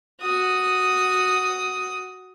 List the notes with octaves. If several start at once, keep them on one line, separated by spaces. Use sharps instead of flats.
F#4 D#6